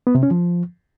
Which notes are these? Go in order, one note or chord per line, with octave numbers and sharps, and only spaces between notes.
B3
C3
C#4
F3